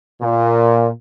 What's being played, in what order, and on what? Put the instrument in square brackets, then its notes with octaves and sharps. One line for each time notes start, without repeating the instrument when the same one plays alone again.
[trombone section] A#2